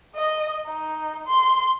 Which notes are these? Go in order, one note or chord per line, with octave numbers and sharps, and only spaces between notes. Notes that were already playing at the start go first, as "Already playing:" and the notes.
D#5
D#4
C6